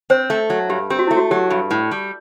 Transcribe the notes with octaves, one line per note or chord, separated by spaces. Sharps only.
C4 C5
A3
F#3
G2 G4
C4 G4
F#4
A3 E4
F#4
F#3 G4
G2
A2
G3